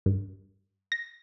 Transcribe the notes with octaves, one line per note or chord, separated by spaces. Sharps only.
G2
A#6